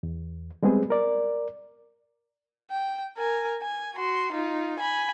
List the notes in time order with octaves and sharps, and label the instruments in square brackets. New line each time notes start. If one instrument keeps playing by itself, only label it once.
[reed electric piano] E2
G3 G#3 B3 C4 G#4
A#4 D5
[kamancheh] G5
A#4 G#5
G#5
F#4 C6
D#4 F4
G#5 B5